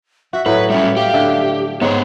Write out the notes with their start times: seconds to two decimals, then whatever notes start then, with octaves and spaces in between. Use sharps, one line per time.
0.33 F#4 E5
0.46 A2 F#3 B4 C#5
0.70 G3 C#4 E5
0.97 G4 F5
1.14 D3 E5
1.81 G#2 B3 C5 C#5